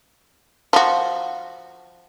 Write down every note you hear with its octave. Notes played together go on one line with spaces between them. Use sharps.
F3 F#4